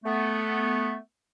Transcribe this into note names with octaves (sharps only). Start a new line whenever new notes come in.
A3 B3